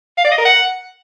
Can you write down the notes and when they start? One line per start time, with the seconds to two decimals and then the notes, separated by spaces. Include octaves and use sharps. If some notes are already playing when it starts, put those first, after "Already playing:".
0.17 F5
0.24 D5
0.31 D#5
0.38 A#4
0.45 F#5